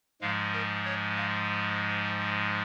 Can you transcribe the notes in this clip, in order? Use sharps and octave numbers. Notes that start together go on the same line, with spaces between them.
G#2 F3 G#3 F5
A#4
C#5
F5